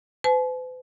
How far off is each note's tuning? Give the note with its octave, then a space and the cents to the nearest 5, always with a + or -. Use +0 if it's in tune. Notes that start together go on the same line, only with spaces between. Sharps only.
B4 +45 A5 -45